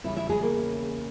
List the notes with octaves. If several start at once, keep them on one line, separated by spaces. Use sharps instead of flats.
E2 C#3 G3 C#4 E4 E5
E4 E5
G#3 G#4
A#3 A#4